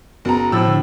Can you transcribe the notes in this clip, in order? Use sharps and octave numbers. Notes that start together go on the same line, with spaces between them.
F#1 B3 F#4 A#5
A2 F3 E6
D3